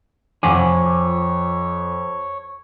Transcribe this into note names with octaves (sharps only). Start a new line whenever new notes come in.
F2 F4 C#5 F#5 G#5 D6